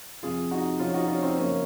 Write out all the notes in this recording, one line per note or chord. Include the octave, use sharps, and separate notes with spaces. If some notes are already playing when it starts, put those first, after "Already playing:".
F2 C3 F3 F4 G#4
D#4 F#4
F2 C3 F3 C#4 F4
D#4 F#4
C#4 F4
C4 D#4
F#2 C#3 F3 A#3 C#4